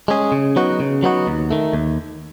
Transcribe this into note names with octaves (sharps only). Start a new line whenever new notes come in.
G#3 C#4 G#4
C#3
F#3 B3 D#4 F#4
C#3
F#3 B3 D#4 F#4
D#2
D#3 A3
D#2